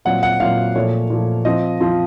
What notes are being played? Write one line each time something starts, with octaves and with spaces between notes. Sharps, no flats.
A#2 F#3 C4 F4 F#5
F#5
A#2 F#3 C4 F4 F5
A#2 F3 A3 C#5
A#2 F3 A3
F3 C4 F4 D#5
F3 C4 F4